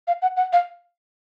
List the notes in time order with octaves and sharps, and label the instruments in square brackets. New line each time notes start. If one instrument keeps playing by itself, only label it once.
[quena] F5
F#5
F#5
F5